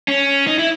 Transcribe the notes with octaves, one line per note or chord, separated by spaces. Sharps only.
C#4
D#4
E4